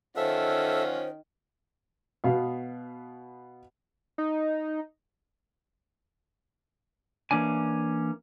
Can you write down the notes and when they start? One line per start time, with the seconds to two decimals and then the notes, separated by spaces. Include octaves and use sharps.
0.17 D#3 C#4 F4 A4 C5 E5 F#5
2.24 B2 B3 F5
4.18 D#4
7.31 E3 A#3 C#4 D4 G#5